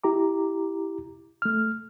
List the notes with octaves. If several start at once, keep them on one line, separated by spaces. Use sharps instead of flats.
E4 G4 A#5 D6
A3 F6